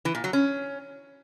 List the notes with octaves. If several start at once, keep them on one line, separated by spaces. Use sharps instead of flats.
E3
A#2
F#3
C#4